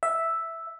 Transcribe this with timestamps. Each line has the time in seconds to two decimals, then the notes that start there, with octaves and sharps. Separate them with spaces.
0.03 E5